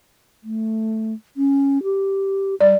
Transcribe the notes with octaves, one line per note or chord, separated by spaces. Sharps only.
A3
C#4
G4
G3 D5